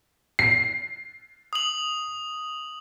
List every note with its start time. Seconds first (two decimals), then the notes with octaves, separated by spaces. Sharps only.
0.39 C7
1.53 D#6 F#7